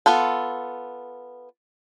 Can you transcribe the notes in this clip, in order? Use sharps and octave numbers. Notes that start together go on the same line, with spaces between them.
B3 F4 A4